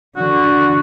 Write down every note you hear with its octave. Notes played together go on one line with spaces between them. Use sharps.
D3 F#4